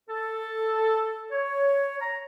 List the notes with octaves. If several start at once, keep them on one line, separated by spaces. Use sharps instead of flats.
A4
C#5
A#5